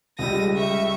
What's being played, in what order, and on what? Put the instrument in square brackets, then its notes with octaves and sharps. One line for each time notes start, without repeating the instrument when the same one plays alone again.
[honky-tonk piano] C#2 G3 [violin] A#6 D#7
[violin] E5 C#6